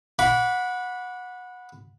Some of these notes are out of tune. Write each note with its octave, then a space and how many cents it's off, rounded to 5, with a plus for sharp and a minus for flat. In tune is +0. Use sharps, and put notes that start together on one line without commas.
F#5 -20 B5 +0 D6 -40